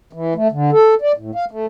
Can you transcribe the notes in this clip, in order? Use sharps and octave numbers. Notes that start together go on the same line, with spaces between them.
E3
A3
D3
A4
D5
A2
F5
A3